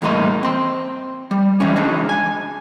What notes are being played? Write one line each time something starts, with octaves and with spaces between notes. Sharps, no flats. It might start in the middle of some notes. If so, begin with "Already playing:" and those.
E2 A2 G3 A#3 D#4 C6
C4 C6
G3
E3 G3 G#3 C#4
C#3 G#3 D4 D#4
G#5